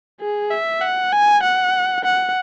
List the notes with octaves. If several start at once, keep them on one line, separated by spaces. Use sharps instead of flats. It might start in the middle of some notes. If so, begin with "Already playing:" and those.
G#4
E5
F#5
G#5
F#5
F#5